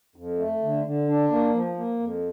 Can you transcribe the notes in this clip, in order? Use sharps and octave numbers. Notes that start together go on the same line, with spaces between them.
F2
A3
D3
D3
D4
A#3
F3
A#3
F2